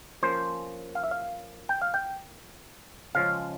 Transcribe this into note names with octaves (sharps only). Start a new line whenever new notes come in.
F3 A#3 C#4 C5
F5
E5
F5
G5
F5
G5
C#3 F3 G#3 C#4 F5